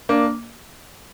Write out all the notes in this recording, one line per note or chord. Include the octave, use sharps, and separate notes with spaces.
A#3 D4